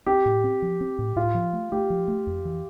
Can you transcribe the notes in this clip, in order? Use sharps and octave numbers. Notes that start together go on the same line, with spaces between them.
C4 G4
A2
C4
F3
C4
A2
A2 F4
F3
A3
A3 G4
F3
A3
F2
E3